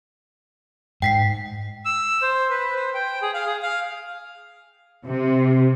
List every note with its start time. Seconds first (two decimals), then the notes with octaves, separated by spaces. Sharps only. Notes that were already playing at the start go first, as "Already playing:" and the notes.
1.02 G#2 G5 B6 C7
1.85 E6
2.22 C5
2.50 B4
2.75 C5
2.94 G5
3.22 G#4
3.34 F5
3.46 G#4
3.62 F5
5.06 C3